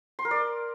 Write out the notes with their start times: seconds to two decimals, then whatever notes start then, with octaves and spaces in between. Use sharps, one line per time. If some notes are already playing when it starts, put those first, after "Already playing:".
0.19 C6
0.25 A#4
0.31 D5